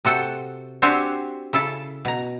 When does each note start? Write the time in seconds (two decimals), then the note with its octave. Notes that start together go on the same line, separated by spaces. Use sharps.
0.05 C3 F#4 A4 G5
0.82 C4 D4 F#4 G4 E5 G#5
1.53 C#3 E4 A4 A5
2.05 B2 A#5